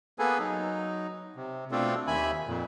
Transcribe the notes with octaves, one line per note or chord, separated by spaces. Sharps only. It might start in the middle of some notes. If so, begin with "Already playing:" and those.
A#3 B3 G#4 A4 B4 G#5
F#3 D#4
C3
B2 A3 C4 D4 F4 A4
D#2 D#3 E5 G#5 B5
F2 A#2